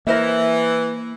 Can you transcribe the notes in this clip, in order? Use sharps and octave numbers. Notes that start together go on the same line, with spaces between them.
E3 A#3 A#4 C5 E5